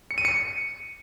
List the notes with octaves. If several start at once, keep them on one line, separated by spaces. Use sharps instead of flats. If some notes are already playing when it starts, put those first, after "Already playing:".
C#7
D#7
C#7